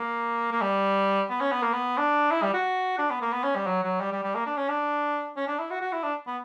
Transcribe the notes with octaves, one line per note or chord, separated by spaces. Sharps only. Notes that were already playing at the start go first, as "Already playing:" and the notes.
Already playing: A#3
A#3
G3
B3
C#4
B3
A#3
B3
D4
E4
G3
F#4
D4
B3
A#3
B3
C#4
G3
F#3
F#3
G3
G3
G3
A#3
D4
C#4
D4
C#4
D4
E4
F#4
F#4
E4
D4
B3